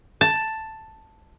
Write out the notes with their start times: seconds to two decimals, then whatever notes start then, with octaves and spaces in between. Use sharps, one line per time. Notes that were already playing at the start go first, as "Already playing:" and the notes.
0.21 A5